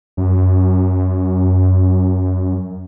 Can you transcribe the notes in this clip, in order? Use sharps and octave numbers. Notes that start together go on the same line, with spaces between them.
F#2